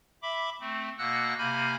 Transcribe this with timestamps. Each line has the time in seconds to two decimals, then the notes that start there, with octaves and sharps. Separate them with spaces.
0.22 E5 B5 D6
0.60 A3 C4
0.98 B2 A#3 F#5 E6 F#6 A#6
1.38 C3 A#3 G#5 B5 F6 G6